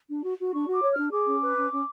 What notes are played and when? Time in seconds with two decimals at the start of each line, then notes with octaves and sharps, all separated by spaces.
0.09 D4
0.23 F#4
0.38 F#4
0.52 D4 C#6
0.67 F#4
0.73 D6
0.82 C#5
0.92 D4 F6
1.11 G#4 D6
1.26 C#4
1.41 B4
1.55 C#4
1.71 C#4